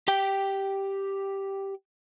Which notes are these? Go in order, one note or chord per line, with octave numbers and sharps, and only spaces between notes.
G4 G5